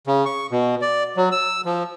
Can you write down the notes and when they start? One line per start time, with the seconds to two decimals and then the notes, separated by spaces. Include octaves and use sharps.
0.07 C#3
0.25 C#6
0.51 B2
0.81 D5
1.17 F#3
1.32 E6
1.65 F3